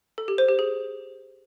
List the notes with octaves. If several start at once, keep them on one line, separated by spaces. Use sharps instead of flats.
A4
G4
C5
G4
G#4